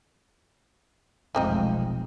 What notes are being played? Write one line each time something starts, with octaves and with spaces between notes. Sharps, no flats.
F1 B1 F3 G#3 C4 D#4